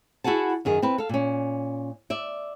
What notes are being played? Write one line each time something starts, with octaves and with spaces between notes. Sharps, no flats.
E4 F#4 G#4 F#5 A5
F#2 D#3 G#4
C4 E4 B4
A4 F5
A#2 C#4
D5 E5